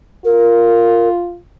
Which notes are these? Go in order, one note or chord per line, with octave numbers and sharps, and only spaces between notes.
F4 A#4